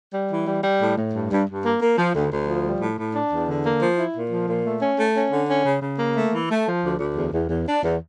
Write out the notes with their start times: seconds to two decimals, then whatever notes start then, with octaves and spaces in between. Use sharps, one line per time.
0.14 G3
0.31 E3
0.47 G3
0.64 G3
0.81 A2
0.98 A2
1.14 G2
1.31 G2
1.47 G2
1.65 A#3
1.81 A#3
1.98 F3
2.15 D2
2.31 D2
2.48 F3
2.64 G3
2.81 A2
2.98 A2
3.15 D4
3.32 E2
3.48 D3
3.66 A#3
3.82 F3
3.99 E4
4.16 A#2
4.31 F3
4.48 A#2
4.66 A3
4.82 C#4
4.99 A3
5.16 C#4
5.32 D3
5.49 C#4
5.65 C#3
5.82 C#3
5.99 A#3
6.16 A3
6.32 E3
6.50 A3
6.67 F3
6.83 D2
6.99 D2
7.17 E2
7.33 E2
7.49 E2
7.67 D4
7.83 E2